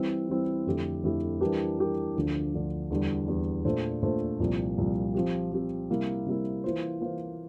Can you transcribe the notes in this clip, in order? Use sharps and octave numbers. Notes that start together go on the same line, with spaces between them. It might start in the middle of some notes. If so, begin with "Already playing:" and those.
Already playing: E3 G3 C4 E4
E3 G3 C4 E4
F2 D3 A3 E4 G4
F2 D3 A3 E4 G4
E3 G3 D4 G4 A#4
E3 G3 D4 G4 A#4
D2 D3 F3
D2 D3 F3
E2 D3 G3
E2 D3 G3
A#2 A3 D4 A4 C5
A#2 A3 D4 A4 C5
C2 A#2 F3
C2 A#2 F3
F3 C4 G4
F3 C4 G4
C3 G3 A#3 E4
C3 G3 A#3 E4
E3 A#3 F4 C5
E3 A#3 F4 C5